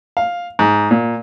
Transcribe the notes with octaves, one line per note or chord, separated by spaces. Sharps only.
F5
G#2
A#2